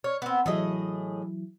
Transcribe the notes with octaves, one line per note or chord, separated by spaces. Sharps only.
C#5 F6
B3 C4
A2 E3 F#3 E4 G#4 D#5